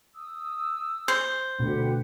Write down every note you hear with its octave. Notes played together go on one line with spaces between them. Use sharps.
D#6 E6
C5
D2 B2 G4 B4 F#5